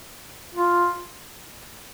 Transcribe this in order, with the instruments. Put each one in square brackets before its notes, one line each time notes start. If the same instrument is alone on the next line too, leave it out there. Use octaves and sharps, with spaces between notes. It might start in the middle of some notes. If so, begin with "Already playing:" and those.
[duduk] F4